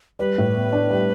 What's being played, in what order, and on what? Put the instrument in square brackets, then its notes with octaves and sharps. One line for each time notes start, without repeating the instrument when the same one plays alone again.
[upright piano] G3 [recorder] B4
[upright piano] A2
B3
D4
G3